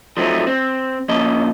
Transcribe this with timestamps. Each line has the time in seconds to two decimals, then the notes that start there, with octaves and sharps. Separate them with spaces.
0.17 F3 F#3 A3 C4 D#4
0.47 C4
1.09 F3 A#3 C#4 D#5